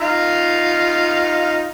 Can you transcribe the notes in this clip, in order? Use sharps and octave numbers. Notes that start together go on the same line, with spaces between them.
D#4 F4 F5